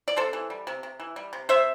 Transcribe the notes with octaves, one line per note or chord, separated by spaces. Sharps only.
D5
C3 A4 C5
E3
G3
C3
C3
E3
G3
C3
C3 C5 E5